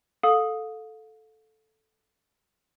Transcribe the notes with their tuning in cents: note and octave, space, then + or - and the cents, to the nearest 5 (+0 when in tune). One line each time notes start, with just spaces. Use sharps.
A4 -5 F5 +35 D#6 +0